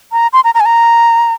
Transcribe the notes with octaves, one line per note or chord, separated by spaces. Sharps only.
A#5
C6
A#5
A#5
G#5
A#5